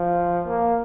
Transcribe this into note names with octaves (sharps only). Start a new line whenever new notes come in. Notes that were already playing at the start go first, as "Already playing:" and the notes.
Already playing: F3
A#3